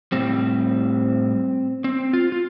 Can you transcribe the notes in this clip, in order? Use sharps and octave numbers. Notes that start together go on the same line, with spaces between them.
A2 G3 C4
C4
F4
F4